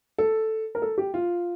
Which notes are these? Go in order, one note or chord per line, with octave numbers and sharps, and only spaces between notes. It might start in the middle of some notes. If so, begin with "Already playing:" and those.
A4
A#4
A4
G4
F4